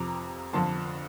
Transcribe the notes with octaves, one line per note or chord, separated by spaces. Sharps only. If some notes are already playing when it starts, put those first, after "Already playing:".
Already playing: F2 C3 F3 A#5 D6
F2 D3 F3 A5 C6